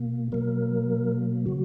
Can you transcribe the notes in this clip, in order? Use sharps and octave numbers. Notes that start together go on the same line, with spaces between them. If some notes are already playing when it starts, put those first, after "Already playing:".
Already playing: B2 A#3
B2 F#3 A#3 A#4
C#3 F#3 F#4